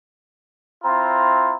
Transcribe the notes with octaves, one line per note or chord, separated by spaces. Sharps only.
C4 E4 F4 A#5